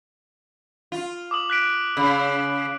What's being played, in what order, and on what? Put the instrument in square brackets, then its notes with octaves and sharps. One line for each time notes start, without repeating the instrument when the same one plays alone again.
[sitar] F4
[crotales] D6 D#6 F#7
F#6 B6 D7
[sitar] C#3